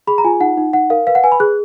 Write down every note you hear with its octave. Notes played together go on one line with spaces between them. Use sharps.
G#4 B5
A#5
F4 G#5
D#4 F#5
D#4
D#4 F#5
A#4 F5
B4 F5
F#5
B4 G#5
B5
G#4 F#6